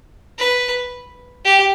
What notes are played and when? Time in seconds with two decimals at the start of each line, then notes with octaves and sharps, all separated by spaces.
0.39 B4
1.45 G4